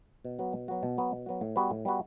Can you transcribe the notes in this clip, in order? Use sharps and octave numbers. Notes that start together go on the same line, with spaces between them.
B2
F#3 B3 F#4
B2
F#3 B3 F#4
B2
F#3 B3 F#4
B2
F#3 B3 F#4
A2
G3 B3 F#4 B4
A2
G3 B3 F#4 B4